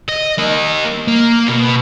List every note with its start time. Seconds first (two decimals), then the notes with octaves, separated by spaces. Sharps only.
0.09 D#5
0.39 A#3 D#5
1.08 A#3
1.48 B2